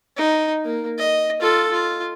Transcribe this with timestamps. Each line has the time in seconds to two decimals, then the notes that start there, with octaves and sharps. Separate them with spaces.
0.16 D#4
0.65 A#3
0.98 D#5
1.40 F4 A4
1.71 F4